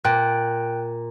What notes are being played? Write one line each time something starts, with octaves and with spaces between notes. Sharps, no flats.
A#2 G5 F#6